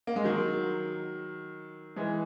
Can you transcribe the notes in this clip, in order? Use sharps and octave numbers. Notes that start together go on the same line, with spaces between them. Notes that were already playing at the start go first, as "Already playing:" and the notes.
A#3
G#3
D#3 F#3
E3 G#3